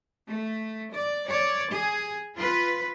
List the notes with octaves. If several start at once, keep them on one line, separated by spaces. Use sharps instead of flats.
A3
D5
C#5 D5
G#4
F4 B4